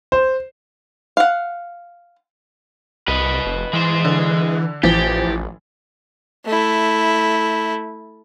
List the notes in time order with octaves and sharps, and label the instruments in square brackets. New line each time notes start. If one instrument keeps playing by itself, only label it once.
[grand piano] C5
[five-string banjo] F5 F#5
[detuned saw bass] C2 [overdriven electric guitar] B4 D#5
[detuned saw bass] F1
[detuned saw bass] E3 [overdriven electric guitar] G#3 C5
[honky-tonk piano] D3
[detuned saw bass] A1 [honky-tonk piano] E3 F3 [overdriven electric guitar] G4
[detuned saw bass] A1
[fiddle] A3 E4